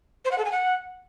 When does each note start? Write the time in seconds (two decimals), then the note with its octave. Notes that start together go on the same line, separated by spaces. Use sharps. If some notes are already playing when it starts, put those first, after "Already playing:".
0.25 C5
0.31 F#5
0.38 A4
0.45 G#5
0.51 F#5